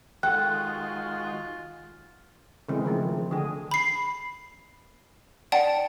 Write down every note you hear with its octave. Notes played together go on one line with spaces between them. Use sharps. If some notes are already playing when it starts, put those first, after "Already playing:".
D#3 G#3 F4 F#4 A4 F#5 G5 F#6
C#3 E3 G#3 C4
D#3 F3 A3
D3 G#4
B5 C7
D5 F#5 G5 A5